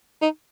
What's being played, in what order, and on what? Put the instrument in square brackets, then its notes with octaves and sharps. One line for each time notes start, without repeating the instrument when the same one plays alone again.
[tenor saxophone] D#4